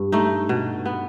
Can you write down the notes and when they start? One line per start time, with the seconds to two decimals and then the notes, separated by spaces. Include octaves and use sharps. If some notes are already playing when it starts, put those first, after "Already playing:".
Already playing: G2
0.12 A3 D#4
0.49 B2
0.86 B3